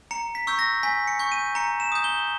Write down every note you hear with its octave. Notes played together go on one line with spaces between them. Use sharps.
A#5 C#7
B6
C#6 E6 G6
A#6
G#5 B6
C#7
C#6 G6
D#7
A#5 C#7
E7
D#6 G6
G7